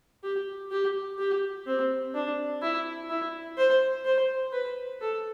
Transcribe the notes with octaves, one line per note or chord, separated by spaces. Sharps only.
G4
G4
G4
C4
D4
E4
E4
C5
C5
B4
A4